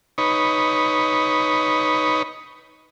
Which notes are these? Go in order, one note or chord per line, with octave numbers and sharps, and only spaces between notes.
D#4 B4 C#5